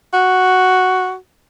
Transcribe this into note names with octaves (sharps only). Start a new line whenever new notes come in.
F#4